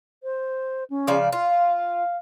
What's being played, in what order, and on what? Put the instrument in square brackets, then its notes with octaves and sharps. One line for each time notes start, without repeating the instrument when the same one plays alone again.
[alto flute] C5
C#4
[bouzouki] C#3 F3 D5
[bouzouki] F4 [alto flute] F5